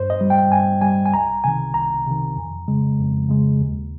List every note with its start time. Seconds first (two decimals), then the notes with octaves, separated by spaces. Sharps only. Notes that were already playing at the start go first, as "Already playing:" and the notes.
Already playing: G2 C5
0.10 D#5
0.21 G3
0.30 G5
0.50 G2 G#5
0.81 G3 G#5
1.06 G#5
1.14 C2 A#5
1.44 C3 D#3 G#5
1.74 C2 A#5
2.06 C3 D#3
2.36 F2
2.68 C#3 G#3
2.99 F2
3.29 C#3 G#3
3.61 D#2